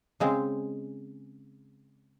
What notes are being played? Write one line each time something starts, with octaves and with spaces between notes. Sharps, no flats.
C#3 G#3 C4